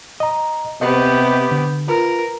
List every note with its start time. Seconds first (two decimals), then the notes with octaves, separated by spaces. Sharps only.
0.20 D#5 A#5
0.81 C3 B3 G4 D#5
1.51 D3
1.88 F4 A#4 B4